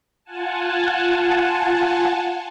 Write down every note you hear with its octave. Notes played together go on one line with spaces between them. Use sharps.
F4 F#5 G#5 A5